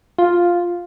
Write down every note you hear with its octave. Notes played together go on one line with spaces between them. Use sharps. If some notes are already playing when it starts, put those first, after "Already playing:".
F4